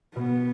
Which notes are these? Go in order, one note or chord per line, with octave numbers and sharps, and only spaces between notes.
B2 B3